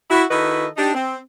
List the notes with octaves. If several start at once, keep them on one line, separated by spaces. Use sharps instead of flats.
E4 F#4
D#3 E4 F#4 A4 B4 D#5
D4 D#4 G4
C4